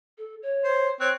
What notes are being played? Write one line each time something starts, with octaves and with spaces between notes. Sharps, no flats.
A4
C#5
C5
C4 C#5 F#6